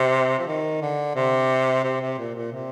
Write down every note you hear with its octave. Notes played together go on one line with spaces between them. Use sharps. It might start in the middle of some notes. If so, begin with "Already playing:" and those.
Already playing: C3
F3
D#3
D3
C3
C3
C3
A#2
A#2
C3